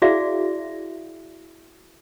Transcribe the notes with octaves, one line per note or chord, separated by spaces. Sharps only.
E4 F#4 G#4 D5 E5 F5